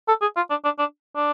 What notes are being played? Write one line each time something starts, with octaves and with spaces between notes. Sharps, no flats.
A4
G#4
F4
D4
D4
D4
D4